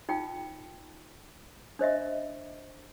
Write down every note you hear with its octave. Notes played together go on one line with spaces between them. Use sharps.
D#4 F4 G5
D4 C5 D#5 E5